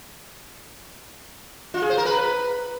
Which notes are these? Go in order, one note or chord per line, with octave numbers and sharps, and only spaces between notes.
F4
G#4
C5
A#4
B4